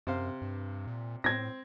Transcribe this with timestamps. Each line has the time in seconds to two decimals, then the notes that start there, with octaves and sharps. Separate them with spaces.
0.07 F#2 C3 C5 F5
0.42 G2
0.87 A#2
1.24 A2 C4 G#6 A#6